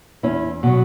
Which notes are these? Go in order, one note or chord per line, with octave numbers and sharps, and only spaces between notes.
E2 C#4 E4
B2 F#3